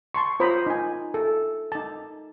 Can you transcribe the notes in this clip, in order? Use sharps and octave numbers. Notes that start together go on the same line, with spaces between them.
A5 C6 C#6
F4 C5 C#5 A#5 B5 D#6
D#4 G#5
A4
D#4 A5